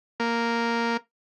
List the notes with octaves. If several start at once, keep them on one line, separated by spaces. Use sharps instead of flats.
A#3